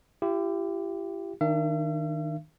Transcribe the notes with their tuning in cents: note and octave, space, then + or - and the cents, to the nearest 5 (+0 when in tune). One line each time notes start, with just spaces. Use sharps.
E4 +45 G4 +0
D#3 +0 D4 +25 E5 +45